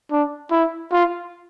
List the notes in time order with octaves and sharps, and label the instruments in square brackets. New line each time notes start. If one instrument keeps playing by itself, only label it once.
[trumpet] D4
E4
F4